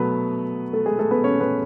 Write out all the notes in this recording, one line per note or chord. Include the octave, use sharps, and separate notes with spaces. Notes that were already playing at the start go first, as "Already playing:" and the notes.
Already playing: B2 F#3 A3 B3 B4
A3 A4
G#3 G#4
A3 A4
B3 B4
C#4 C#5
B3 B4